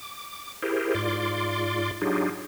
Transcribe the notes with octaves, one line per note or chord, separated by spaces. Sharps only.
D6
E4 G4 G#4 A#4 C5
G#2 F4 D5 C6 D6
F#3 D4 D#4 F4 G4 G#4